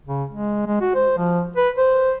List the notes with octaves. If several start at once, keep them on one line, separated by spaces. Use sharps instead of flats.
C#3
G#3
G#3
F#4
C5
F3
B4
C5